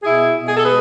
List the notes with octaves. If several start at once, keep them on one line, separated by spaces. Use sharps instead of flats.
B2 E4 G#4
B2
G#4
A4
G#3 G#4 B4